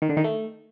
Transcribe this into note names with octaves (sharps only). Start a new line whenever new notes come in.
D#3
D3
D#3
A3